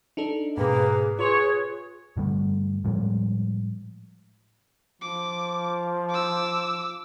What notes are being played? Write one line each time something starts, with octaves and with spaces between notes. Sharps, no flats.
D4 D#4 A4
G#2 B2 A#3 G#4 B4
F4 G#4 B4 C#5 C6
G2 D3 G3 A3
A2 F3 G3 G#3
F3 D6
D6 E6